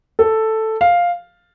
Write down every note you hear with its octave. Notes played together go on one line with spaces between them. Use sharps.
A4
F5